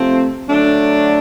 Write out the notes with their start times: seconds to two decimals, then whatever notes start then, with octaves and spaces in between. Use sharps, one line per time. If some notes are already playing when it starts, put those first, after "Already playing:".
Already playing: C3 F3 A3 C4
0.48 D3 F#3 A3 D4